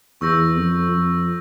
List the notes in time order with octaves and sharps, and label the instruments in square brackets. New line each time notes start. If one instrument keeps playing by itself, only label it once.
[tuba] E2 [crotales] C#6 E6 G6 A#6
[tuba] F2
F2